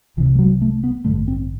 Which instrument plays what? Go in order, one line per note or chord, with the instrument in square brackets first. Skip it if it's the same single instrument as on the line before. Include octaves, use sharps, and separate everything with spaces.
[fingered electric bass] C2 C3 E3
G3
F#3
A3
B3
A1 G2 D3 A3
C4